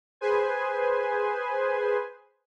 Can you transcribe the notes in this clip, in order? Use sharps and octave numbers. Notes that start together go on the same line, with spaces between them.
G#4 B4 C5 G#5